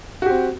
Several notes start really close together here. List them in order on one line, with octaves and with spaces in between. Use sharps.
F#4 G4 C4